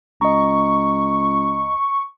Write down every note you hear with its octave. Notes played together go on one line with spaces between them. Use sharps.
C#2 D#5 A#5 C#6